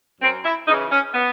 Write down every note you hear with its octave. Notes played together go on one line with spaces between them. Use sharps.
F#2 C4
E4
C#3 E3 D#4
C#4
B3